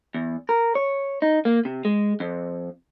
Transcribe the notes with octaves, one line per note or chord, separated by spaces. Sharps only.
E2
A#4
C#5
D#4
A#3
C3
G#3
F2